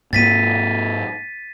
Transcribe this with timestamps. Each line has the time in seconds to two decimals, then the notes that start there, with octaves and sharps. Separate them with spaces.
0.13 G#2 A#3 A6 B6 D#7